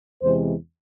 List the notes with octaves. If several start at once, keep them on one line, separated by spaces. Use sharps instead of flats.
E2 C3 E3 G#3 C5